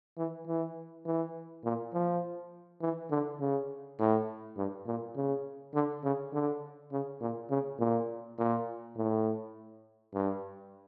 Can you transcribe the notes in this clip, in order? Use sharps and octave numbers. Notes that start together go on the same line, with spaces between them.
E3
E3
E3
A#2
F3
E3
D3
C#3
A2
G2
A#2
C#3
D3
C#3
D3
C#3
A#2
C#3
A#2
A#2
A2
G2